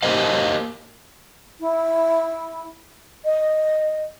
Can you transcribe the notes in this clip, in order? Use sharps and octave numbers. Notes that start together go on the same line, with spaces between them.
A#3 G4 A#4 C5 D#5 F5
E4
D#5